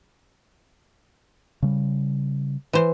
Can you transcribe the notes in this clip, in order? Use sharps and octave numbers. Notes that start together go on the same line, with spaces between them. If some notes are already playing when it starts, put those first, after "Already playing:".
C#3 G3
E3 C5